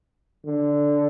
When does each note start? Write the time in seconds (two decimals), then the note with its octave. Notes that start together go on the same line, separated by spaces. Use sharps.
0.46 D3